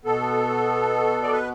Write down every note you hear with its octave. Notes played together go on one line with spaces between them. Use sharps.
B2 B3 A4
D5
B4